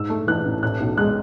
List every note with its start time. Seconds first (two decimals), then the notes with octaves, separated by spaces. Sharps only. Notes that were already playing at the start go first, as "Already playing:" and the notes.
Already playing: G#2 E6
0.10 A3
0.27 E3 F#6
0.46 A1
0.62 A2 F#6
0.80 B1
0.98 G#3 F#6